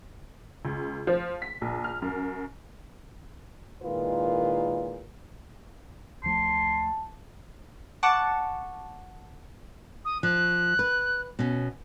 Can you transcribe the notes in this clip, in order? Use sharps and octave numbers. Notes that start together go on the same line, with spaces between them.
C#2
F3
B6
A#1
F6
F#2
A#2 D#3 G#3 E4 F4 B4
D2 F3 A3 A5 C6
F#5 A5 C#6 D6
D#6
F3 F#6
B4
B2 C#4